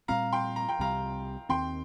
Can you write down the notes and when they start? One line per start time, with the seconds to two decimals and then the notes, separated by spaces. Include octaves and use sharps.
0.08 A#2 G3 C4 F5 A#5
0.32 G5 C6
0.56 A#5
0.69 G5
0.79 C2 C3 G3 F5 A#5
1.49 D#2 D#3 C4 G5 C6